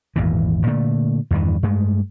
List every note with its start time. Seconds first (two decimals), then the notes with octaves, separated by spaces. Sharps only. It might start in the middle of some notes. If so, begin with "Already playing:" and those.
0.16 G#1 E2 A#2 E3
0.67 A#2 D3 A3
1.31 E2 G2 D#3 E3
1.63 G2 G#3 A3